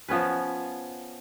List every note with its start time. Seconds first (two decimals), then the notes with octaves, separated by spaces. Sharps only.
0.08 F3 B3 C#4 B4